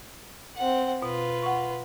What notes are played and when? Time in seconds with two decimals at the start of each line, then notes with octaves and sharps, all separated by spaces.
0.57 C4 F#5
1.02 B2 F4 B4
1.43 F#5 C#6